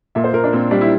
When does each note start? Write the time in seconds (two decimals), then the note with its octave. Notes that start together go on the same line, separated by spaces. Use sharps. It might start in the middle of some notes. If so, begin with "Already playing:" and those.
0.15 A#2 E5
0.24 C5
0.33 A#2 A#4
0.44 D4
0.53 A#2 C4
0.71 G3 D4
0.81 E4